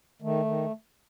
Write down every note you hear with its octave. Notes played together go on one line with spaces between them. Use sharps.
D#3 A3
D#3